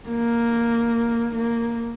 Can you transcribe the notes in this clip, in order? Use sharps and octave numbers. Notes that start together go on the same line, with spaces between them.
A#3
A#3